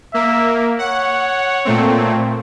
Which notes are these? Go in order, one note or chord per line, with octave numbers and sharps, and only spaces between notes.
A#3 E5
C#5 F#5
A#2 A3 C4